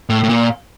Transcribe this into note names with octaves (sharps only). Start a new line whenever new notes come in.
A2
A2
A#2